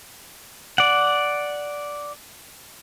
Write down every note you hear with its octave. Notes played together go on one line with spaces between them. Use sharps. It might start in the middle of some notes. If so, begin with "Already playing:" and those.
D5 F#5